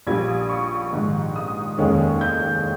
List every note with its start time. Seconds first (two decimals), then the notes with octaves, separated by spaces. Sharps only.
0.07 A#1 A#2 G3 G#6
0.28 D#6
0.49 C#6
0.92 A#1 G#2 D#3
1.36 D#6
1.78 F1 D#2 D#3 G#3 C#4
2.21 G6